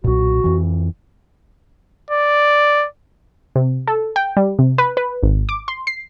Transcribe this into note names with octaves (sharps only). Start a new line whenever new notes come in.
B1 A#2 F#4
F2 E3
D5
C3
A4
G5
G3
C3
B4
B4
G#1
D6
C6
C7